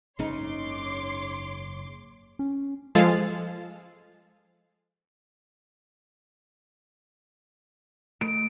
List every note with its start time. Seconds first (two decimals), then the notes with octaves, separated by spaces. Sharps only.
0.19 F#1 G#2 C#3 C#4 D#4 C#5 C6 D6
2.39 C#4
2.95 F3 G#3 F4 A4 A6
8.21 A3 D7